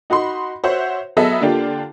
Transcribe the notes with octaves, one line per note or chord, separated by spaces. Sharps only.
D#4 F#4 B5 C6
F#4 C5 C#5 E5 F#5
F#3 B3 G#4 A4 D#5 E5
D3 A#3 D4 F4 G4